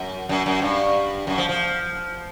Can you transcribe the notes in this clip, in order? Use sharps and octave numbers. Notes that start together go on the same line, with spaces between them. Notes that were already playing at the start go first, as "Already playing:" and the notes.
Already playing: F#2
F#2
F#2
G2
F#2
F3
F3